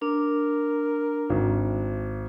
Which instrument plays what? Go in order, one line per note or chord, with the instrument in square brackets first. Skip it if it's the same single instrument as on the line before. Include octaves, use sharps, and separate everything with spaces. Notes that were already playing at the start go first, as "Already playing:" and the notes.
[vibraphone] D4 [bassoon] A#4
[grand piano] G#1